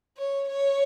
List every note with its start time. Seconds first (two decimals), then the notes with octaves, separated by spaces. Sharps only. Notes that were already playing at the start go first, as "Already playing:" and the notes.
0.18 C#5
0.48 C#5